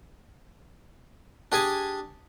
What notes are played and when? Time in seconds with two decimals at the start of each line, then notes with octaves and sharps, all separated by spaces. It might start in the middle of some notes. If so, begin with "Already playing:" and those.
1.52 D4 G4 G#4 G#5